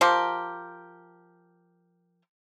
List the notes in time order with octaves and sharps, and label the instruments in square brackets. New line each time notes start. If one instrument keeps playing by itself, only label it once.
[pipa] F3 G4 A#4